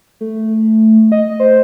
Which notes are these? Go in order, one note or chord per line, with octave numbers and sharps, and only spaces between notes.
A3
D#5
C5